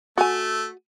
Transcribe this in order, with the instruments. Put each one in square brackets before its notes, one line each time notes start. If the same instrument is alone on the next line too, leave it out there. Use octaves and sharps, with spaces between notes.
[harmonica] A3 [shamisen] F#4 G#5